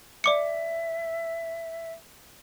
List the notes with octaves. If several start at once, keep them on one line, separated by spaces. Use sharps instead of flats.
D5 E5 D6 C#7